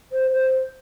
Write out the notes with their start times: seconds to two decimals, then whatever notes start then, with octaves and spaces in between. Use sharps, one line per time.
0.12 C5
0.33 C5